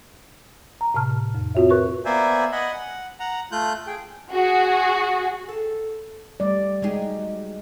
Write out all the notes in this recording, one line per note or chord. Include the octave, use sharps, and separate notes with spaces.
A#5
A2 C3 A5 F6
F2
C4 F4 F#4 C#5 E5
F#4 A#4 B4 C#6 F#6
A#3 B3 C5 D5 E5 G#5
D#5 F#5 G#5 B5
F#5
F#5 A#5
A3 F4 F#6 G6
G#4 G5
F#4 G#4
G#4 A4
G3 A3 D5
F#3 G#3 D#4 G4 G#4